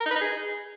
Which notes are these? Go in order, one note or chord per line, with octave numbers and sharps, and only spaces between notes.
A#4
D#4
B4
D#4
G#4